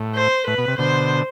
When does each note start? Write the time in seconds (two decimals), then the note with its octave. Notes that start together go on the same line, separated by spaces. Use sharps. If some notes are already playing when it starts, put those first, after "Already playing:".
Already playing: A2
0.15 C5
0.47 A2 B4
0.58 B2
0.68 C3
0.78 B2 D3 C5